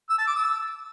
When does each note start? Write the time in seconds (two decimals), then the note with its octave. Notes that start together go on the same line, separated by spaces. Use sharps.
0.10 E6
0.18 A5
0.27 D6
0.36 E6